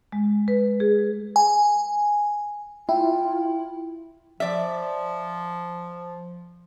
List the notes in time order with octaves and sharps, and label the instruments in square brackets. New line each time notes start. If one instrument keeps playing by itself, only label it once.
[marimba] G#3
B4
G#4
[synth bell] G#5
[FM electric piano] E4 [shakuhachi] F4 [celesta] G5
[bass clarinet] F3 [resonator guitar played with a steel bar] D5 E5